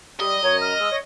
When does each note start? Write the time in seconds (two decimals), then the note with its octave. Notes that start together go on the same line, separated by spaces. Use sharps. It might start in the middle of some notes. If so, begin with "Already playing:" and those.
0.20 G3 D#5 D#6
0.43 F#2 C#5 A#5
0.61 F6
0.80 G#3 D#6 E6
0.91 C#5